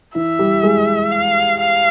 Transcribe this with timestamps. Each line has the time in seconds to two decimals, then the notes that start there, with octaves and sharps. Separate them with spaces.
0.15 E3 E4 E5
0.39 G3 G4
0.63 G#3 G#4
1.12 F5
1.60 F5